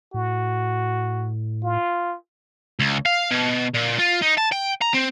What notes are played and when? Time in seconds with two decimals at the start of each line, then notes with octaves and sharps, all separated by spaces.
0.14 A2 F#4
1.63 F4
2.79 C#2
3.06 F5
3.31 B2
3.75 A#2
3.99 F4
4.22 D#4
4.38 A5
4.52 G5
4.82 A#5
4.94 C4